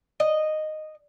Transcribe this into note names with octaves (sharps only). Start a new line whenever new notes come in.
D#5